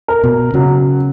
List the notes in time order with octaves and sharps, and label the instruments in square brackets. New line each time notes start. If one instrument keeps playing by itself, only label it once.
[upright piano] A#4
[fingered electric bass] B2
[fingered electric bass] C#3 [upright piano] F#3